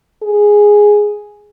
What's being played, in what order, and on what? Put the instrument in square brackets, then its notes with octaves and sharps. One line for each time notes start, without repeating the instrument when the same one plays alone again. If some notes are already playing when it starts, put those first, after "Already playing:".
[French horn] G#4